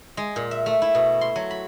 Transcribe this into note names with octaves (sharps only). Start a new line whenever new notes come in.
G#3
A#2
E5
A3
E4
B2
C6
F#3
B5